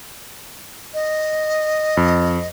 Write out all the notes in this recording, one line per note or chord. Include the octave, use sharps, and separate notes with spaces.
D#5
F2